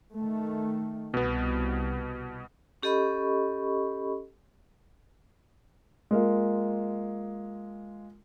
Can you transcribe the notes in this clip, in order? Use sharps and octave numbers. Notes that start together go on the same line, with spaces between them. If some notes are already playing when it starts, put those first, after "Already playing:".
D#3 A3
C2 B2 B3
C#4 G4 A4 D#5 B5 C#6
G#3 A#3 F4